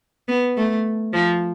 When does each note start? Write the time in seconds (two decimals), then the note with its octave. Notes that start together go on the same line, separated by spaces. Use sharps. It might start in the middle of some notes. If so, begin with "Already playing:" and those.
0.29 B3
0.57 A3
1.14 F3